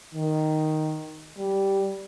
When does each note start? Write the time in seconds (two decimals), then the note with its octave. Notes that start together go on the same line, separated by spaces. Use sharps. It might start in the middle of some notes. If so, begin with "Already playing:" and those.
0.14 D#3
1.38 G3